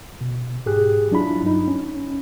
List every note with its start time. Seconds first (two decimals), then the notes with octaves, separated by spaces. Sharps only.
0.21 B2
0.66 G#2 G4 G#4 F#6
1.11 F#3 D4 E4 F4 B5
1.43 G2 D#4
1.68 C#4